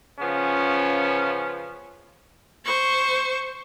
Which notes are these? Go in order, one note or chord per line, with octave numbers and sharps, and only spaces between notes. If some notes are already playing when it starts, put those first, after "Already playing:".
C#3 F3 B3 C#4
C5 C#6